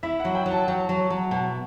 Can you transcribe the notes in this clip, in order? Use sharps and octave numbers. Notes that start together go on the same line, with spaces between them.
E4 E5
F#5
F#3
G5
F#3
A5
F#3 G5
F#3
F#3
B2